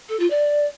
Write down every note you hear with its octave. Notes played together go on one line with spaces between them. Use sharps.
A4
F4
D5